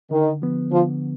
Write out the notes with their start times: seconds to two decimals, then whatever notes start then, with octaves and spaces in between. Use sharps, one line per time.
0.11 D3 D#3
0.42 F3 B3
0.72 D3 F3